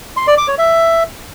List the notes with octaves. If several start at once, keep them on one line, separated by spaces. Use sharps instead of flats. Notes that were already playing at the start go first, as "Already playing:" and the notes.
C6
D5
D6
C#5
E5